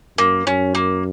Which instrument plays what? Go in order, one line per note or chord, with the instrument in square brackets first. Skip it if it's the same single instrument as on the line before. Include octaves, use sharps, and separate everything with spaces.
[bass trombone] F#2 [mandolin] A#3
[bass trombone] F#2 [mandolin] C#4
[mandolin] A#3